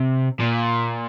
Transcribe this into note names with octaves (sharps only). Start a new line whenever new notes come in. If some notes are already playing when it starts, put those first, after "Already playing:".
Already playing: C3
A#2